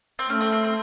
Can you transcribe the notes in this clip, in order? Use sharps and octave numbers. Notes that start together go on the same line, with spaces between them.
C4
A3 C#4
C4
C4
C4